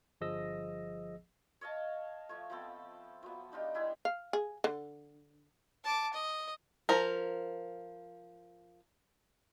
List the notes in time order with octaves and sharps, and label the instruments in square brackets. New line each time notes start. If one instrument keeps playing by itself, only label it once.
[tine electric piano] G1 F3 G#4 D#5 E6 A#6
[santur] C#5 D#5 F5 A5
F3 A3 C#5
F3 B3 C4 A4
F3 F#3 B3
D4 D#4 F4 G4
G#3 E4 G4 G#4
[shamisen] F5
G#4
D3
[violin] A5 D6
D#5
[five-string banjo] F3 A#4